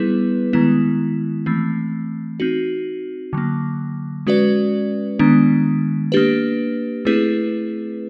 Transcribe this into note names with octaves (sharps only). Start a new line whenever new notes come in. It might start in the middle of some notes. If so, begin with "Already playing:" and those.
Already playing: G3 B3 E4 G#4 B4
D#3 G#3 B3 E4
E3 A3 C4
C4 D#4 F#4
D3 F#3 A#3
G#3 C#4 F#4 B4 D5
D#3 G#3 B3 D4
A#3 D4 G4 B4
A3 C4 E4 G#4 B4